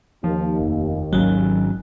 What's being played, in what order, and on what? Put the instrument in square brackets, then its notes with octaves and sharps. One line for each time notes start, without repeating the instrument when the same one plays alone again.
[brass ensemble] D#2 [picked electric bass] F3
[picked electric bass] F1
[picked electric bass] G#1 D#3 C#4 [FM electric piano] F#3